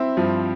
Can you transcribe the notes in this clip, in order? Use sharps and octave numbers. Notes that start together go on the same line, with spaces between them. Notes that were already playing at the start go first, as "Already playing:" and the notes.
Already playing: C4 E4
G2 F3